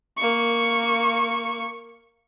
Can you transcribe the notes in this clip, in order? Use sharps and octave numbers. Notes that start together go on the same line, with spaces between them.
A#3 C#6